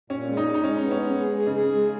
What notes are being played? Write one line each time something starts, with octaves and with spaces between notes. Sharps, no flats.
A#2 C#4
G#3
D#4
G#3
D#4
G#3 C#4
B3
C#4
G#3
G#4
G#4
C#3
G#4
G#3